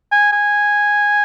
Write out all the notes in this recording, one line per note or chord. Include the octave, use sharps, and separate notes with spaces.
G#5
G#5